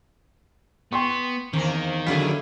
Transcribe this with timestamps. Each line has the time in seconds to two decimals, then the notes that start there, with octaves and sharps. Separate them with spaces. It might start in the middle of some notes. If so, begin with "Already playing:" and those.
0.93 B3 G5 C6 C#6
1.53 E2 D#3 A#3 C4
2.06 D3 F3 C#4 E4 G#4 F5 B6